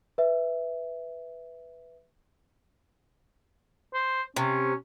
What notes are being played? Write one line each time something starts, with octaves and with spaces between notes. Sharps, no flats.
B4 E5
C5
C3 C#4